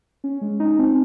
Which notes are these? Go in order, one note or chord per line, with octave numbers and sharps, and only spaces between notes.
C#4
G#3
D#4
C4